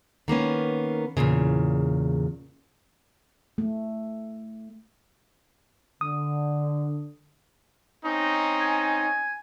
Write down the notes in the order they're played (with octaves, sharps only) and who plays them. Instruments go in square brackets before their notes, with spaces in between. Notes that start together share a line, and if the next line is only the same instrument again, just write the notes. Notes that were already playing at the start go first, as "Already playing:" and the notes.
[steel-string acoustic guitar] D#3 A#3 B3 C#4
E2 G2 A#2 C#3
[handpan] A3
[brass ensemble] D3 [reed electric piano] D#6
[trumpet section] C4 C#4 D#4
[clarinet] G#5